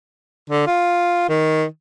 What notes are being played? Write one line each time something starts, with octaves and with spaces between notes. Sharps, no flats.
D3
F4
D#3